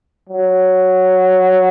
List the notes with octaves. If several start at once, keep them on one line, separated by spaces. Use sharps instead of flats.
F#3